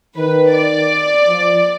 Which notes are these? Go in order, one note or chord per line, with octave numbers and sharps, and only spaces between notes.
D#3 B4
D5
F3